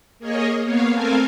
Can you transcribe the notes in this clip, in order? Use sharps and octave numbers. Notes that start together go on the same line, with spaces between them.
A#3 G#4 C#5 D#5
A#3 B3 C#5 F5
A3 C4 A4 A#4 F5 G#5